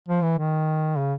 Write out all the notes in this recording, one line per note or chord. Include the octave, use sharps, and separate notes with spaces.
F3
E3
D#3
C#3